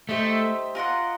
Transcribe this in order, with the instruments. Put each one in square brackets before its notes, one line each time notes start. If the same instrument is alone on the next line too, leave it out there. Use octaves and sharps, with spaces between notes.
[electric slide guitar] A3 [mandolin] D#4 G4 C5 E5
[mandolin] F4 A#4 D#5 F#5